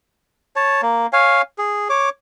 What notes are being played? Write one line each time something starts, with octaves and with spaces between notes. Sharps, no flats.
C#5 A5
A#3
C#5 F5 G#5
G#4
C#5 D6